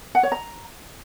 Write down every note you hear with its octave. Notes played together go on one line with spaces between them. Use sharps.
F#5
C#5
A#5